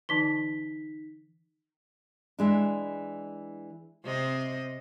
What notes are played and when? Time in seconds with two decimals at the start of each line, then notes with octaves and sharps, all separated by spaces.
0.09 D3 E3 D#4 A5 B6 G7
2.39 E3 G#3 D4
4.05 C3 C4 D#5